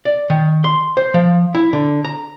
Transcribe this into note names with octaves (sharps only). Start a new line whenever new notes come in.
D5
D#3
C6
C5
F3
E4
D3
A#5